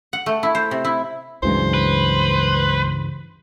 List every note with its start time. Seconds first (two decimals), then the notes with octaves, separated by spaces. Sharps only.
0.13 F#5
0.26 A3
0.43 E4
0.55 C5
0.71 C3
0.85 E4
1.43 C#2 G2 C#3 E3 F#3 G#3 C5
1.74 B4